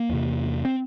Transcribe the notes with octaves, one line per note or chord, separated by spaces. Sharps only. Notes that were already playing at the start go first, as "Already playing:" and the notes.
Already playing: A#3
E2 C3
C4